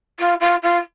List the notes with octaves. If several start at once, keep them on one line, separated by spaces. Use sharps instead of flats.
F4
F4
F4